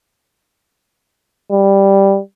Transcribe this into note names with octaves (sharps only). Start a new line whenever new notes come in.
G3